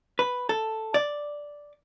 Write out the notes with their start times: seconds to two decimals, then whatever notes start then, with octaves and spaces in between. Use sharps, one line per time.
0.19 B4
0.49 A4
0.94 D5